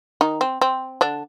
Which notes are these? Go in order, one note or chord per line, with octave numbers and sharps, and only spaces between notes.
D#3 D#4
C4
C4
D3 D4